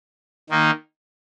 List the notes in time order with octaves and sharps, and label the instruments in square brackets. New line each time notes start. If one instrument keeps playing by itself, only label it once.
[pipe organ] D#3 A#3 D#4